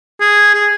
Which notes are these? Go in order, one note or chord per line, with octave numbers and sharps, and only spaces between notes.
G#4
G#4